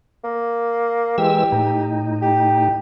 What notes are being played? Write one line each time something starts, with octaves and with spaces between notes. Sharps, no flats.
A#3
E3 G#3 G4 E6
A2 D#4
G4